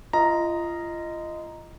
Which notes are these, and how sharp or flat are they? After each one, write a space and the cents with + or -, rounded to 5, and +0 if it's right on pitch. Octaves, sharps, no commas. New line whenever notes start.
F4 -30 D#5 +0 A#5 +0